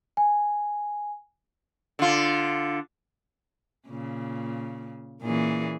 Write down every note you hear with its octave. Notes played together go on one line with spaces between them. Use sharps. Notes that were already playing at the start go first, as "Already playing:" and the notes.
G#5
D3 F4
A#2 C#3
A#2 E3 C#4 G#4